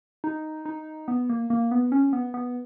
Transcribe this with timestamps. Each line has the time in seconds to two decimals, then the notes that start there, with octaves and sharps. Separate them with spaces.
0.24 D#4
0.66 D#4
1.08 B3
1.29 A#3
1.50 A#3
1.71 B3
1.92 C#4
2.13 B3
2.34 B3